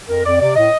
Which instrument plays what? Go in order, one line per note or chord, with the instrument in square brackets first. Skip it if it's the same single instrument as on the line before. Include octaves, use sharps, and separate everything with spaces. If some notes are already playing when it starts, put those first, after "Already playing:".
[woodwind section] F2 A#4
F2 D5
C3 D5
A2 D#5